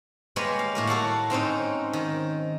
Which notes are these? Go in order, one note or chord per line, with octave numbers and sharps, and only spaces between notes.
G3 G#3 A#3 A#4 B4 C#5
F5
A2 A#3 A#4
F#4 A4 F5 F#5
G#2 C4 C#4 D#4
D#3